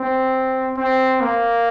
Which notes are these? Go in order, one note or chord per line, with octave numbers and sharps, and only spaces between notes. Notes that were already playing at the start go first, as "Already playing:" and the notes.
Already playing: C4
C4
A#3